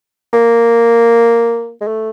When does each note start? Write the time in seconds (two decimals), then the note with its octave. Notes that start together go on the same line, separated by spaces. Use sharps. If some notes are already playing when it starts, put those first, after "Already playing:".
0.33 A#3
1.81 G#3
1.87 A3